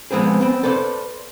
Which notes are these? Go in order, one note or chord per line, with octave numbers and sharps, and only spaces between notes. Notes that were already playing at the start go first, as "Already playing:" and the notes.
F3 G#3 B3 C4 G#4
B3 C4
A4 B4 C5 D5